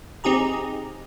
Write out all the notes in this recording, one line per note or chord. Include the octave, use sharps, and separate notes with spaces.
C4 D#4 G4 G#4 A#5